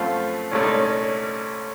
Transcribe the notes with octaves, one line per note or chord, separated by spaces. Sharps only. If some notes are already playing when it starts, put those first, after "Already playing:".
Already playing: F#2 F3 A3 C4 F4
C2 A#2 A3 C#4
D#4
C#4
C#4